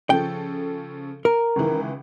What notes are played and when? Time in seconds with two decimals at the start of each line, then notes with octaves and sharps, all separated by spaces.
0.10 C#3 F3 A4 G5
1.25 A#4
1.56 C#2 D#3 E3